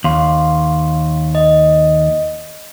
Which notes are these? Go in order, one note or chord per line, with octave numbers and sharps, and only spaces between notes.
D#2 F5 C6
D#5